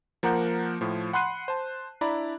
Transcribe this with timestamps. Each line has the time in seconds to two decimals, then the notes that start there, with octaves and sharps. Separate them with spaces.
0.23 F3 A#3 A#4 F#5 G6
0.81 A2 F3
1.13 F#5 B5 C6 F#6 C7 D#7
1.48 C5 A5
2.01 D4 E4 D5 A#5 B5